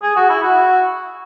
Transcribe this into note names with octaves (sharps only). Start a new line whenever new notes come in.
G#4
F#4
E4
F#4